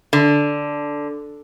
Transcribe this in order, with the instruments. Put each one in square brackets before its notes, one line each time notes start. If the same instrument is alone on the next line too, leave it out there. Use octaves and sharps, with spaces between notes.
[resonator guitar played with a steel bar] D3